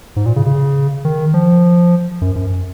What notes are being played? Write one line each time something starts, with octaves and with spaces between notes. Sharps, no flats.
G#2
A#2
C#3
C#3
D#3
F3
F#2
F#2